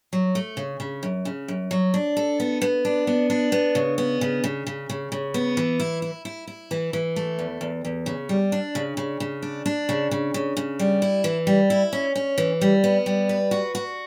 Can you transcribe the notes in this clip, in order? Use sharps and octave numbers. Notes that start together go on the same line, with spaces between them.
F#3
A3
C#3
C#3
F#2
C#3
F#2
F#3
D4
A4
B3
B3
D4
B3
D4
B3
C#3
B3
C#3
C#3
C#3
C#3
C#3
B3
E3
E4
E4
E4
E4
E3
E3
A3
E2
E2
E2
C#3
G3
D4
C#3
C#3
C#3
D4
D4
C#3
C#3
C#3
C#3
G3
E4
E3
G3
E4
C#4
C#4
E3
G3
B3
G3
B4
F#4
F#4